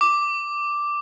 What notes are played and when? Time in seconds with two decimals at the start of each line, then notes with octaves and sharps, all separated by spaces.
0.01 D6